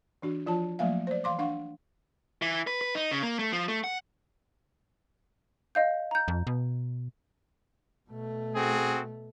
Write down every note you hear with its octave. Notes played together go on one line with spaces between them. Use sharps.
E3 D4 F#4
F3 F4 C#5 A5
F3 F#3 A3 A#3 E5 F5
C5 D5
E3 F5 C6 D6
D4 F5 F#5 C#6
E3
B4
B4
D#4
C#3
A#3
A3
F3
A3
F#5
D#5 F5 G6
A#5 G6
F2
B2
B2 A3
C4 F#4 G#4